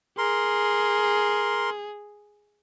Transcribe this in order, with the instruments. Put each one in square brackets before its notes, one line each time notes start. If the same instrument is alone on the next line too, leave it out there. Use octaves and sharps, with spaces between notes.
[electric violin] G#4 [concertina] A#4 C6